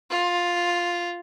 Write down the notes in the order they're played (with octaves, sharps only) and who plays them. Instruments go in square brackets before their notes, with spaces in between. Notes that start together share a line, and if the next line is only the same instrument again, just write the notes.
[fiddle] F4